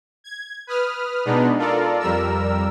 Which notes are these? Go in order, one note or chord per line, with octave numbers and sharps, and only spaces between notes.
G#6
B4 D#6 F6
B2 G#3 B3 D4 D#4 B4
F4 A4 A#4 D5
F2 G3 A#4 E6